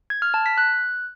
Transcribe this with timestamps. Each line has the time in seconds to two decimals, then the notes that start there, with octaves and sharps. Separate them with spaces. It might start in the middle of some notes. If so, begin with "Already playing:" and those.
0.10 G#6
0.22 F6
0.34 A5
0.46 B6
0.58 F#6